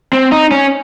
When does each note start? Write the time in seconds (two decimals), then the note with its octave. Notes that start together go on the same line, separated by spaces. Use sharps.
0.13 C4
0.32 D#4
0.51 C#4